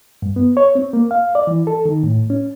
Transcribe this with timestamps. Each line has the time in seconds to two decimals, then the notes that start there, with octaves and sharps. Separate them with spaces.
0.22 G2
0.36 B3
0.57 C#5
0.75 C4
0.93 A#3
1.11 F5
1.35 D5
1.47 E3
1.67 A4
1.86 D#3
2.03 A2
2.30 C#4